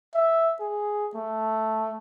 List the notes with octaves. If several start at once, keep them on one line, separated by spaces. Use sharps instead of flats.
E5
G#4
A3